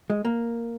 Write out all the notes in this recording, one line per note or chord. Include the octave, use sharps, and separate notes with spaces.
G#3
A#3